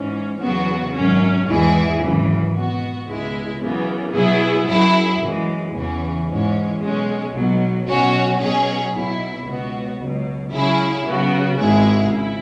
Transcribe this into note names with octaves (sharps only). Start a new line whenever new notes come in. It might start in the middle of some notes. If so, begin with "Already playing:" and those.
Already playing: G#2 E3 C#4
E2 C#3 F#3 B3 F#4
G#1 F#2 F#3 C#4
E2 E3 G#3 E4 G#4
G#1 F#2 C#3 E3
B2 B3 F#4
C#2 B2 G#3 E4
F#2 C#3 E3 B3
B2 F#3 B3 E4 G#4
F#2 F#3 E4 G#4
F#2 E3 G#3
E2 C#3 E3 C#4
G#2 E3 G#3 C#4
B1 B2 G#3 C#4
B1 B2 F#3
B1 B2 F#3 C#4 F#4
B2 F#3 C#4 G#4
B1 B2 F#3 E4
C#2 B2 B3 F#4
C#2 B2 F#3
C#3 F#3 C#4 E4 G#4
C#3 F#3 B3 F#4
G#1 G#2 G#3 E4 G#4
C#3 E4